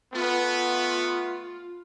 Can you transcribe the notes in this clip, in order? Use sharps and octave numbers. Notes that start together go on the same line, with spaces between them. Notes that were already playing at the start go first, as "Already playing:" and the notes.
A3 B3 F4